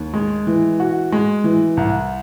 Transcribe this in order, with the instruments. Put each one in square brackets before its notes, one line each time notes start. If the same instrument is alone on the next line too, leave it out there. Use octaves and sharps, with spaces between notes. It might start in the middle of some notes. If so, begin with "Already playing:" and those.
Already playing: [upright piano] D#2
G#3
E3
F#4
G#3
E3
C2